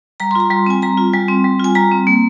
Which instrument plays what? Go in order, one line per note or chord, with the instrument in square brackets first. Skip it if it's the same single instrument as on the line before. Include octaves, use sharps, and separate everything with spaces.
[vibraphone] G3 A#5
C6
F4 A#5
G3 C6
C4 G#5
G3 A#5
F4
G3 G#5
C4
G3
F4 G#5
G3 A#5
C4
A#3